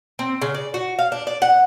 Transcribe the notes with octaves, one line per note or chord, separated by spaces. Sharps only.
C4
C#3
D5
F#4
F5
D4
D5
F#5